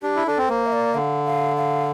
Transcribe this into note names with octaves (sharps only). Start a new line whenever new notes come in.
D4 G4
E4
D4 A4
C4
A#3 C5
E5
D5
D3 F5
F5
F5